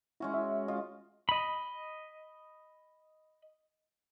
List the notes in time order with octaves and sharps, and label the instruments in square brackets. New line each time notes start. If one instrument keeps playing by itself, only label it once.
[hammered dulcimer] G#3 C#4 F#4 [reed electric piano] E4
[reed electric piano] E5
[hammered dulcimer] F4 [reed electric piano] D#5
[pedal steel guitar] D#5 B5